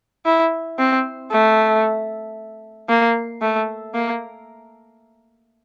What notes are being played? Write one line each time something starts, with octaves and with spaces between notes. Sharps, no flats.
E4
C4
A3
A#3
A3
A#3